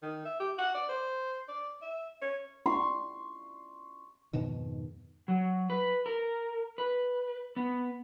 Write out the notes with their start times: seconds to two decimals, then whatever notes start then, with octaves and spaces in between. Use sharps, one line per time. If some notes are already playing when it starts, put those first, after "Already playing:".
0.03 D#3
0.25 E5
0.40 G4
0.58 F#5
0.74 D5
0.89 C5
1.48 D5
1.82 E5
2.22 C#5
2.66 C6 C#6
4.33 F2 G#2 B2 D#3
5.28 F#3
5.70 B4
6.06 A#4
6.78 B4
7.56 B3